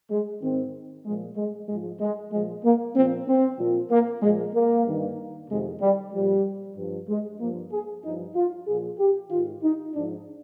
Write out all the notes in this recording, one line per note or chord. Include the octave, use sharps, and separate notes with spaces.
G#3
G#2 D#3 C4
A#2 F3 G#3
G#3
G#2 F3 G#3
G#3
A#2 F3 G#3
A#3
A#2 F3 C4
C4
A#2 F3
A#3
A#2 F3 G#3
A#3
G2 D#3
F2 C3 D#3 G#3
G3
A#2 F3 G3
G2 F3
G#3
G2 F3 A#3
G#4
G2 F3 D#4
F4
A#2 F3 G#4
G4
G#2 D#3 F4
D#4
G#2 F3 D4